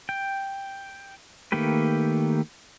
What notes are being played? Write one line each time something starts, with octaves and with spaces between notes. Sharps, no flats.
G5
D#3 A3 A#3 G4 B4